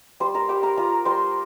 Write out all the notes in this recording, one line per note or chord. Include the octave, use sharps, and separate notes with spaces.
G3 C5 C6
A#4 A#5
G3 G4 G5
A#4 A#5
F4 A#4 A#5
G3 C5 C6